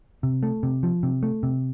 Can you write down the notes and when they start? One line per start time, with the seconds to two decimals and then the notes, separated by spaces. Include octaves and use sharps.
0.23 C3
0.43 A3
0.63 C3
0.83 F3
1.03 C3
1.23 A3
1.43 C3